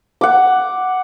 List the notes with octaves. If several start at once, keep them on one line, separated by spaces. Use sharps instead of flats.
F#5 D6